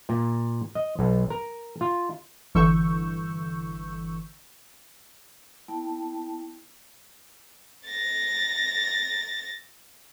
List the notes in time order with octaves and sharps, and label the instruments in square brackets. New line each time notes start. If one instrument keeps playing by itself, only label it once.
[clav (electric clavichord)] A#2
D#5
B1
A#4
F4
[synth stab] G1 D3 E3 C#6 E6 G6
[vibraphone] B3 E4 G5 A5
[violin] A6 A#6